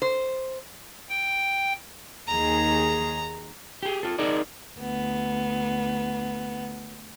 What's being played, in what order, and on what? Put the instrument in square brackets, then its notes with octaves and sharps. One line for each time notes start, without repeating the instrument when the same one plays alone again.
[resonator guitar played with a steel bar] C5
[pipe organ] G5
[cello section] D#2 D#3 G#4 [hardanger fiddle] A#5
[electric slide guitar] G4 G#4
F4 A4
D#4 G#4 A#4 D5
[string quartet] D2 B3